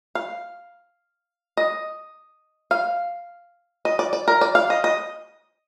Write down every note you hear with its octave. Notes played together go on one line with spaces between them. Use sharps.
F5
D#5
F5
D#5
D5
D5
A#4
D5
F5
D#5
D#5